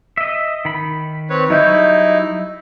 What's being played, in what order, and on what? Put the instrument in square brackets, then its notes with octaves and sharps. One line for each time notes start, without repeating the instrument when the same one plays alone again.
[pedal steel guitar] D#5 E5
D#3 B5
[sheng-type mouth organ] C4 B4 C#5
[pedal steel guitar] F#3 G3 G6 [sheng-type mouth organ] D#4 E4